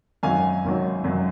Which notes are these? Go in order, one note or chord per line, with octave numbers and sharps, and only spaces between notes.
G#1 F#2 D#3 F#3 F5 G#5
G#1 F#2 D#3 F#3
G#1 F#2 D#3 F#3